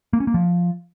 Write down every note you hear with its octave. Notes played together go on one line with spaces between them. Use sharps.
A#3
C#4
A#3
F3